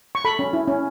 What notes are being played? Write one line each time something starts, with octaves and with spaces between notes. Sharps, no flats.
C#6
A4 B5
C#4
E4
C#4